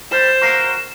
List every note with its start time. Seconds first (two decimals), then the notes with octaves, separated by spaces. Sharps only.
0.11 G3 C5 E7
0.42 F#4 A#4 F5